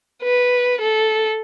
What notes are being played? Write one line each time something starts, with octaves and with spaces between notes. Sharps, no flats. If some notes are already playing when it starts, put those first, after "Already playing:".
B4
A4